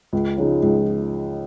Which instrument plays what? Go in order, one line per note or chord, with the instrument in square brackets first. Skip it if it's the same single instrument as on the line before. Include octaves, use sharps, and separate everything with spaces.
[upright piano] C#2
C#3 F3 G#3 D#4
C#2